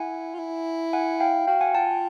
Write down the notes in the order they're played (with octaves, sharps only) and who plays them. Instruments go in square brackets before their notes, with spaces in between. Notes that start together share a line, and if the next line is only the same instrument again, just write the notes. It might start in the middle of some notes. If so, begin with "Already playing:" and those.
Already playing: [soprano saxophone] E4 [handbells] F#5 G#5
[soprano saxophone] F4
E4
[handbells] F#5 G#5
F5 G5
[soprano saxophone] F#4 [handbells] F5 G5
[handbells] F#5 G#5
[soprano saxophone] F4 [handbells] G5 A5